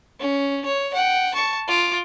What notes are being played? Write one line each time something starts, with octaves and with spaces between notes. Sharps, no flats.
C#4
C#5
F#5 G5
A5 C#6
F4 D6